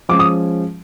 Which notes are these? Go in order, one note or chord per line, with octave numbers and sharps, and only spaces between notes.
F3 G#3 C#4 D6
D#6